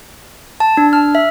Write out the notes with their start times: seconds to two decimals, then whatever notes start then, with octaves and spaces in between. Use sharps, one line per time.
0.60 A5
0.77 D4
0.93 F6
1.15 E5